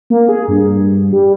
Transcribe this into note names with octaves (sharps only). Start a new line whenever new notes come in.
A#3
G#4
G2
G3